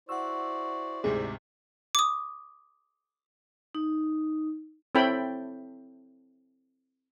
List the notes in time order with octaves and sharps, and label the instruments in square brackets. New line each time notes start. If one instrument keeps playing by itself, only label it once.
[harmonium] E4 C5 D5 [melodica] F#4 [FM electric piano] F#5 E6
[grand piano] D2 G#2 C3 [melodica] G4 [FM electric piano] G#4
[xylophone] D6 D#6
[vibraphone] D#4
[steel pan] C4 E4 A4 C#5 G5 B5